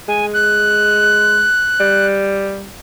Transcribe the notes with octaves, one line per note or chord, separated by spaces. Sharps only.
G#3 G#5
F#6
G3